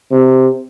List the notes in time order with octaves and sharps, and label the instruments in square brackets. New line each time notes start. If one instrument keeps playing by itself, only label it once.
[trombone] C3